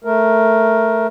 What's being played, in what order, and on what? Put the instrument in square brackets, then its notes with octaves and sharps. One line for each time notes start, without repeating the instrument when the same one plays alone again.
[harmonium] A3 A#4